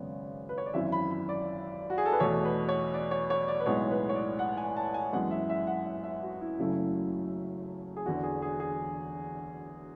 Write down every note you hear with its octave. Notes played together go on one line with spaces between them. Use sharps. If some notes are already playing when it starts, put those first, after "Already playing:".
Already playing: G#1 F#2 C#3 G#3 B3 C#5 D5
B4
C#5
D5
G#1 F#2 E3 E5
B5
B5
D5
F#4
G#4
A4
B4
E2 B2 A3 C#5
B4
C#5
D5
C#5
C#5
D5
B4
B1 A2 G#3 B3 C#5
B4
C#5
D5
F#5
G#5
A5
G#5
F#2 E3 G#3 B3 F#5
E5
E5
F#5
E5
E5
F#4
E4
F#1 F#2 C#3 F#3 A3 E4
G#4
E1 E2 D3 F#4
G#4
G#4
G#4